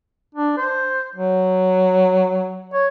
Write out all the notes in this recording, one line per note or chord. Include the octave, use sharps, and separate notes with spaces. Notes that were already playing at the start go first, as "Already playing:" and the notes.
D4
C5
F#3
C#5